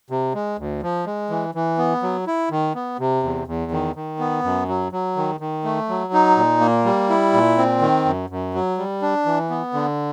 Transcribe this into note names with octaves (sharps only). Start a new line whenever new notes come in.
C3
G#3
D2
F3
G#3
E3
E3
B3
F#3
E4
D#3
B3
C3
E2
E2
D#3
D#3
B3
F#2
F#3
F#3
D#3
D#3
A3
F#3
D#4
A#2
A#3
G3
E4
A#2
C4
D#3
F#2
F#2
F#3
G3
D4
E3
B3
D3